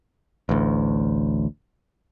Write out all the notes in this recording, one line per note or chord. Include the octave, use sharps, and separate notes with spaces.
A1 D2